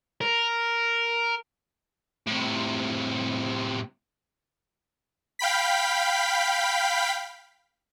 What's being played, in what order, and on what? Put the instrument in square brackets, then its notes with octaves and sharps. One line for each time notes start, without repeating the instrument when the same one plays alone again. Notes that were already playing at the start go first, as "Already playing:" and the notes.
[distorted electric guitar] A#4
A2 C3
[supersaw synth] F5 G5 B5 B6